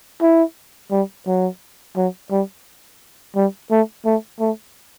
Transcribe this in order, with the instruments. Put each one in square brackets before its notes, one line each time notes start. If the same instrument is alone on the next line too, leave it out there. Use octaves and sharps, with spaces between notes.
[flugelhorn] E4
G3
F#3
F#3
G3
G3
A3
A3
A3